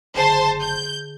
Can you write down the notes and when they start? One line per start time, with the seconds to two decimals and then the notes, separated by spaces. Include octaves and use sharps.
0.15 F#1 D3 G#4 C5 G#5 A5 C6
0.60 G6